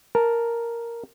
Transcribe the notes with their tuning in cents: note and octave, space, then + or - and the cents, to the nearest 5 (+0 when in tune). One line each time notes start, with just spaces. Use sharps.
A#4 +0 A5 +0